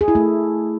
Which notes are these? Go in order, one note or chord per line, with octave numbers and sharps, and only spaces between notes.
G#4
E4
A3